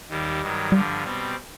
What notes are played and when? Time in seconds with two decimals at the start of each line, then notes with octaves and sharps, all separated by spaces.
0.09 D#2 D#3 G3
0.41 G2 D#3 F#3
0.72 G2 D3 F3 G3
1.04 B2 G3 C4